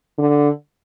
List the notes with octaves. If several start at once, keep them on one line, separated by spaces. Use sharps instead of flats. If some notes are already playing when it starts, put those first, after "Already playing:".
D3